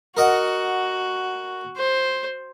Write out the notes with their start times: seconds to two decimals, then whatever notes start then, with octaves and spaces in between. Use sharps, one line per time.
0.17 F#4 A#4 D#5 F#5
1.77 C5